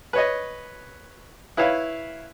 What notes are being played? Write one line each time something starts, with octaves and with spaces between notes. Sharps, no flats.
B4 C#5 D#5
E4 B4 C#5 F5